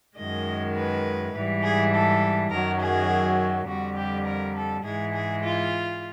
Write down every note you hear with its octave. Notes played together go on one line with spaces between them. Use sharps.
F#2 D#3 G#3 D#5
B4
G#2 E3 G3
G#4
A4
F#2 D#3 F#3 A#4
G#4
F2 D3 G3 F#4
G4
A#4
A4
G#2 E3 G#3 G#4
G#4
F4